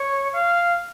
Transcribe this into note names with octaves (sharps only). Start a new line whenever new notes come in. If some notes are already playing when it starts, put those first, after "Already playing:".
Already playing: C#5
F5